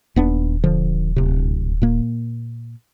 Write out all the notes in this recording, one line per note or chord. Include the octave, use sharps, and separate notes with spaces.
D#1 D#2 B3 D4
D3 F3
D1 C3
A#2 A#3